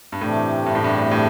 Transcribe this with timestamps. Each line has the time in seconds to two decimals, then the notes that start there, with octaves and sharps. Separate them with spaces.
0.12 G2
0.21 E2 A2 C3 A3 D4 G4
0.66 G2
0.75 A2
0.84 G2
1.11 A2